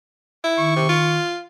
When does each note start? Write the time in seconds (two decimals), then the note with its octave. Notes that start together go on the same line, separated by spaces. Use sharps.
0.44 E4
0.58 D#3 C#6
0.76 C3
0.89 F4